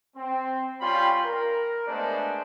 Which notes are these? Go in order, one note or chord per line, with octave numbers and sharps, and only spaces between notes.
C4
G3 C#4 F4 G5 B5 C6
A#4
G#3 A3 B3 D4 C5 D5